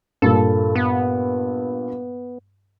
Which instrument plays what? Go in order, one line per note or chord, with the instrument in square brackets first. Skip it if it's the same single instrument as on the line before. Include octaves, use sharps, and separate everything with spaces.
[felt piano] G2 A#2 [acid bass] A4
[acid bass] B3